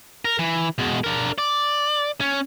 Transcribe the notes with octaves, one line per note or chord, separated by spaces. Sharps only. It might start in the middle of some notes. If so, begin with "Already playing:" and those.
A#4
E3
B2 G#3
D4 A#4
D5
C#4